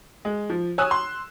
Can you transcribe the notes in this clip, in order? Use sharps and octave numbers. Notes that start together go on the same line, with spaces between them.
G#3
F3
C#5 G#5 D#6 E6 F#6
C6